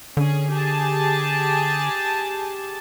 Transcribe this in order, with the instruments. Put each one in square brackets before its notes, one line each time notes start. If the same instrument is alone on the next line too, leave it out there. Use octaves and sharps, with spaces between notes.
[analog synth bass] D3 [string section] C#4 G#4
[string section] G4 G#4 A5